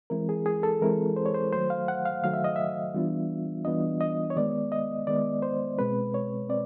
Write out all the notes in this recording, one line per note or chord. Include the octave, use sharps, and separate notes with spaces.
E3 G#3 C4 E4 A#4
G#4
G#4
A4
E3 G#3 C4 E4 A#4
C5
C#5
C5
D#3 F#3 A3 C5
F5
F#5
F5
D#3 F#3 A3 F5
E5
D#5
E5
E3 G3 B3 D4 F4
E3 G3 B3 D4 F4 D#5
D#5
C#5
D#3 G#3 B3 D5
D#5
D#3 G#3 B3 D5
C5
B2 G#3 C4 B4
C#5
C4 D5